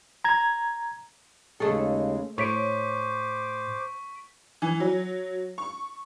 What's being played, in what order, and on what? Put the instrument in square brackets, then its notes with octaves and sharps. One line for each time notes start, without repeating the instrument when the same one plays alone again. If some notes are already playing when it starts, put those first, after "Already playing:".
[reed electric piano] A#5 G#6
[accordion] D#2 C#3 G#3 [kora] A3 G#4 A4
[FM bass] A2 [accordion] C5 D6 [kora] C#5 [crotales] C#6 B6 D7
[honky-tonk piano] E3
F#3
C#6